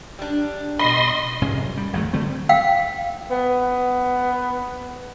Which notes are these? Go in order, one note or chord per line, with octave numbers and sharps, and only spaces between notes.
G3 D4
B2 D#5 B5 C6
F1 G#2 C3 C#4
F#3
G3
G#1 F2 F#3 A3
D3 F#3 A3 C4
F5 G5
B3